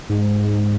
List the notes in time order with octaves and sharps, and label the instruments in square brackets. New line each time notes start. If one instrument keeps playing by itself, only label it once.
[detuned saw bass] G#2